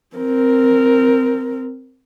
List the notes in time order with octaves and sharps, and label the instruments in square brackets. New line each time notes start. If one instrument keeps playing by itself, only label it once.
[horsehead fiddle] C4 A#4